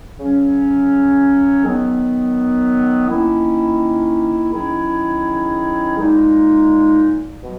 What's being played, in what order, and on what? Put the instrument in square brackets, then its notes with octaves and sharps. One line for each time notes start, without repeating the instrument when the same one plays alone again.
[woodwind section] C#3 F#3 C#4
D#3 F#3 B3
D#3 A#3 C#4 E4
D#3 F#3 C#4 E4 G#4
A#2 G#3 D#4
B2 F#3